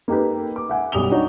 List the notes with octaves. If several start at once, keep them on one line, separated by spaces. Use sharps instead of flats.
A#3 D#4 G4 A4 B4
D6
E5 F#5 G#5
B1 G3 D#6 F7 G7
D4 D#4 F#4 C#5